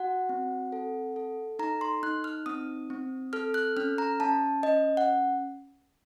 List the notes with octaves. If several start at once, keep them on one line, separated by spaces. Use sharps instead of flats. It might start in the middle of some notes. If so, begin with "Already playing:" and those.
Already playing: F#4 F#5
C4
A4
A4
D#4 A#5
C6
D#4 F#6
F6
C4 D#6
C4
A4 F6
F#6
C#4 F6
A#5
C#4 A5
C#4 D#5
F#5